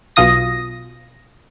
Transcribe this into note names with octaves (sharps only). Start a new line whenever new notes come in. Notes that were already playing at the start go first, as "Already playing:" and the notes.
B1 B2 F4 D#6 A#6